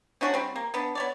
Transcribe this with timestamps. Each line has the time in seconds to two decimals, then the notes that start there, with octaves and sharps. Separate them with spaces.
0.21 C#4 D4 F#4
0.34 G3 C4
0.56 A#3
0.74 B3 D4
0.95 B3 C#5 D5